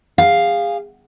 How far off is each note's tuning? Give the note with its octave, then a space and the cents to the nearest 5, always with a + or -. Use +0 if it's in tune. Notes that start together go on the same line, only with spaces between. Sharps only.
G#4 -30 F5 +0